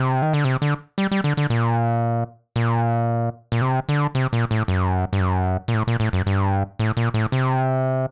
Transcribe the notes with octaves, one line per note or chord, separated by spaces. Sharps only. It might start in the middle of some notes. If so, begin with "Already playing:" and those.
Already playing: C3
D#3
D3
C3
D3
G3
G3
D3
D3
A#2
A#2
A#2
C3
D3
C3
A#2
A2
F#2
G2
F#2
A#2
A2
A#2
A2
F#2
G2
A2
A#2
A2
C3